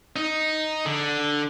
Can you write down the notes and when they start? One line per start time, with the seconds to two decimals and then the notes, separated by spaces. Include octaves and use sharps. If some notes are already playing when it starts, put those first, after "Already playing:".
0.16 D#4
0.86 D3